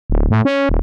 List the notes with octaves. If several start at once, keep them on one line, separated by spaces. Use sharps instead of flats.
D1
A2
C#4
D#1